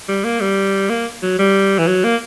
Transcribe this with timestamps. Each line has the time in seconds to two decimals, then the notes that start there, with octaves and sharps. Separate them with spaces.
0.09 G3
0.24 A#3
0.41 G3
0.89 A#3
1.23 F#3
1.39 G3
1.78 E3
1.87 F#3
2.04 A#3